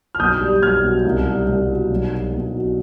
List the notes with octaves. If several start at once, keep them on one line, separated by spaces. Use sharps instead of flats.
F6
B1 D#6 G6
G3
B1 F6 G#6
B2
C2
G3
C2
B2
B1
G3
B1
B2